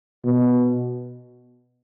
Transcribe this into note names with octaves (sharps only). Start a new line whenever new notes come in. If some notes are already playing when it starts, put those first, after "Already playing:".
B2